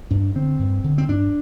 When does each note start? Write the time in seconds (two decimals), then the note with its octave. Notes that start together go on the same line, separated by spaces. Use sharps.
0.11 G2 D4
0.35 D3 C4
0.59 G2
0.84 D3
0.98 C4
1.08 G2 D4